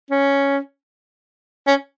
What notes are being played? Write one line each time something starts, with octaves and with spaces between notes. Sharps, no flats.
C#4
C#4